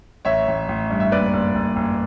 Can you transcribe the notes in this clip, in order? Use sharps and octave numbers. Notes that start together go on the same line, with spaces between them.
A1 C#5 E5
A1
A1
G2
E5
F#1 B4 D5
F#1
F#1
F#1